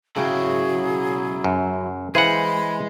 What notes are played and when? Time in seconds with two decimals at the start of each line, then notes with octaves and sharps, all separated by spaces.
0.16 C#3 F#3 E4 G#4 G5
1.44 F#2
2.15 E3 G#3 G#4 C5 F5 F#5 B5